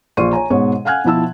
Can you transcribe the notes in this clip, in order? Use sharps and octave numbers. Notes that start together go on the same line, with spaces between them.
A#1 F4 D5 C6 C#6 D#7
C#5 G#5 A#5
G#2 B2 C#5
F5 F#5 G#5 F6 F#6 G#6
B2 F3 E4 A5 E6